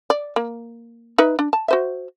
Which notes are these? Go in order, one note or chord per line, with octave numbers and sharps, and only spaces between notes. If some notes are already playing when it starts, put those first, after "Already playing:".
D5
A#3
D#4 B4 E5
D4
A5
F#4 C5 E5